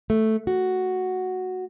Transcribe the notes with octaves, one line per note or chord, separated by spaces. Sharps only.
A3
F#4